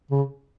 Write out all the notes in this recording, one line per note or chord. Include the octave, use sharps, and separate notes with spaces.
C#3